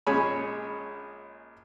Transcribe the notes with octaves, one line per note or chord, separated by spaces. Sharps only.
A#1 G#3 C#4 C#5 G#5 B5